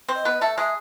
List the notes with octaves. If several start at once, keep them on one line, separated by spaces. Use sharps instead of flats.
C4 C5
D#5
B3 B4
A3 A4 E5
G#3 G#4 E5